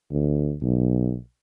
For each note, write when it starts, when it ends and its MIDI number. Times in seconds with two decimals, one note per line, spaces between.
0.11 0.55 38
0.62 1.16 35